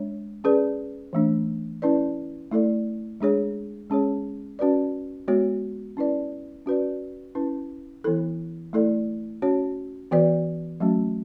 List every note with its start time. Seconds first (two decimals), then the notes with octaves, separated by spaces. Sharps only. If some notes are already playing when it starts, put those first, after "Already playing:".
Already playing: G#3 D4 C#5
0.44 C#4 G#4 B4 D5
1.13 E3 A3 D4
1.82 C#4 E4 B4 D5
2.51 A3 E4 A4 D5
3.21 G#3 D4 G#4 C#5
3.90 G#3 C#4 G#4 C#5
4.59 C#4 F#4 B4 D5
5.28 G#3 B3 F#4 C#5
5.97 C#4 E4 B4 D5
6.66 C#4 F#4 B4 D5
7.35 C#4 E4 B4
8.04 E3 B3 E4 A4
8.73 A3 E4 A4 D5
9.42 C#4 F#4 C#5
10.11 E3 B3 F#4 B4 D5
10.80 F#3 A3 C#4 F#4